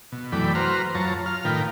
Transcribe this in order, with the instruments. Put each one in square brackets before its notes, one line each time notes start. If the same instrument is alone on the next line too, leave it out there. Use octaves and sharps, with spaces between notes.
[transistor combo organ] B2
F#2 E3 A3 D5 G5 B5
F#4 B4 C5 A#5 F6
F#2 F4 C#5 A5 A#5
F4 F6
A2 D#3 A#4 B4 F5 G5